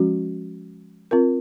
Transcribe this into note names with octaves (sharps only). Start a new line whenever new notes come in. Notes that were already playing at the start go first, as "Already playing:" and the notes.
Already playing: F3 G#3 C#4 F#4
C4 F4 A#4